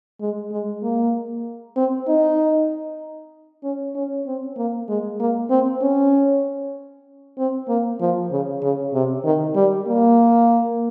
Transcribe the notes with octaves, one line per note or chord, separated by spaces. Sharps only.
G#3
G#3
A#3
C4
D#4
C#4
C#4
C4
A#3
G#3
A#3
C4
C#4
C4
A#3
F3
C#3
C#3
C3
D#3
G3
A#3